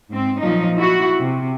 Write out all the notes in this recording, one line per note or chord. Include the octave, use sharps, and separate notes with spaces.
G#2 C4
A#2 F3 F#3 D#4
E4 F#4
C3